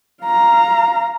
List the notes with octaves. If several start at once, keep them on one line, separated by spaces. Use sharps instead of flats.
F5 A#5